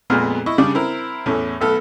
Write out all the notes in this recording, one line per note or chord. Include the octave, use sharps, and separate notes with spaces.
F2 A#2 G#3 A#3 B3 F6
E4 D#5 C#6
C#3 G3 D4 D5
C4 E4 A#4
E2 A2 A3 C#4
B1 A3 B3 A4 F6